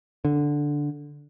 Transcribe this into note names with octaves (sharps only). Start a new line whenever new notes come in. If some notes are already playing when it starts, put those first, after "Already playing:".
D3